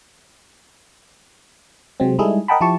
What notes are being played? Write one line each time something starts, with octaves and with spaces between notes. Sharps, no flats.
C3 F#3 G#3 C4
G3 G#3 D#4 E4 G#4 A4
A#4 D#5 F#5 G5 A5 B5
F3 E4 G4 A5 C#6